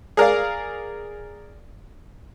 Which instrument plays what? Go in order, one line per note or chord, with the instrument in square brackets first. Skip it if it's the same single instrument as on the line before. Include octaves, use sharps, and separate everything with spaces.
[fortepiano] G#4 A#4 D5 F5